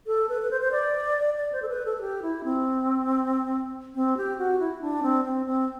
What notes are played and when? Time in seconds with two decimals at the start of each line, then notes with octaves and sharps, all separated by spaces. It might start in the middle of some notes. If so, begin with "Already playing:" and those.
0.07 A4
0.29 B4
0.42 B4
0.51 C5
0.61 C5
0.72 D5
1.36 D5
1.52 C5
1.62 A4
1.69 B4
1.86 A4
1.97 A4
2.01 G4
2.22 E4
2.44 C4
3.95 C4
4.17 G4
4.38 F#4
4.59 E4
4.81 D4
5.03 C4
5.25 C4
5.46 C4